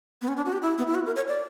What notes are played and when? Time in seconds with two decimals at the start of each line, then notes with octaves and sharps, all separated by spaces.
0.22 B3
0.28 C#4
0.37 D4
0.45 F#4
0.53 G4
0.62 E4
0.78 B3
0.87 E4
0.95 F#4
1.06 A#4
1.16 C#5
1.28 D5